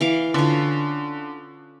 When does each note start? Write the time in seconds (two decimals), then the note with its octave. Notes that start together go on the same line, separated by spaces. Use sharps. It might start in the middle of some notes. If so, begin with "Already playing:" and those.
0.01 E3 F5 D6
0.34 D3 C#4 F4